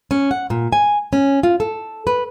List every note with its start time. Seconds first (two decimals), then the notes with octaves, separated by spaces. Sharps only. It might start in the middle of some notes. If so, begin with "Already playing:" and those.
0.11 C#4
0.31 F#5
0.50 A#2
0.72 G#5
1.13 C#4
1.43 F4
1.60 A4
2.07 B4